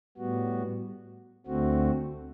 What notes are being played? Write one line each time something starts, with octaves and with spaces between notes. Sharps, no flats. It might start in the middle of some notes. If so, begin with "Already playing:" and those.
A2 G3 B3 F#4
D2 D3 A3 C4 F#4